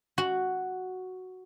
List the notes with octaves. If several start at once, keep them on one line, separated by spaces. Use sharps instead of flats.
F#4